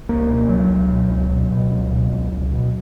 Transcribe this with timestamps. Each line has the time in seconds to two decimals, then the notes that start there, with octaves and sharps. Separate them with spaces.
0.09 C#2 A#3
0.29 B2
0.49 C#2 F#3
0.69 C#2
0.90 B2
1.10 C#2
1.31 B2
1.51 B2
1.71 C#2
1.91 B2
2.12 C#2
2.32 C#2
2.52 B2